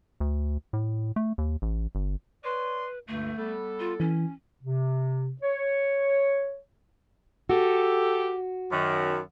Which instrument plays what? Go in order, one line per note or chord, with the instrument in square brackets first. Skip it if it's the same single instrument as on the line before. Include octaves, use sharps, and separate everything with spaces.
[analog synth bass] D2
A2
A3
D#2
A1
G1
[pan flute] B4 [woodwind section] C#5 D5 C6
[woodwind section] C#2 G2 D3 [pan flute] A3
[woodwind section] G3 B3 A4
[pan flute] F4
[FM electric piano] E3 [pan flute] C#4
[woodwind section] C3
C#5
[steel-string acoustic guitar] F#4 [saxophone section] G4 A4
[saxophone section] F#2 D#3